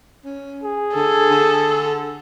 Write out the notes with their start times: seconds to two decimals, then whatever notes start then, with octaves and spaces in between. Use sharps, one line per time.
0.25 C#4
0.64 G#4
0.96 D3 A4
1.30 D3